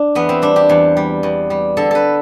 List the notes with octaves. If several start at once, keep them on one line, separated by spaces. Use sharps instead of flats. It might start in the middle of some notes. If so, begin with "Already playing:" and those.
Already playing: D4
E2 B3
C4
G3 D4
G4
E2
G3
E2
G3
D3 A4
A4 B4